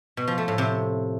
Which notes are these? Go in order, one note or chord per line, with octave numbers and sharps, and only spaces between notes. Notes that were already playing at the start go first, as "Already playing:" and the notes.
B2
F3
A3
A2
C3